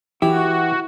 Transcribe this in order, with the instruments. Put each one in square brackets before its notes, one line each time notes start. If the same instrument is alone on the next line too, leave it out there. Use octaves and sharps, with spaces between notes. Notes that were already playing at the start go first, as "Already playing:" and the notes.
[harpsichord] E3 [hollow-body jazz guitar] E4 [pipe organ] F#4 [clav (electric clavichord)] G4